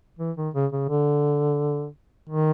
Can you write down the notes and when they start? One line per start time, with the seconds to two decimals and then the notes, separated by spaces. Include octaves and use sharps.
0.19 E3
0.37 D#3
0.54 C#3
0.72 C#3
0.89 D3
2.29 D#3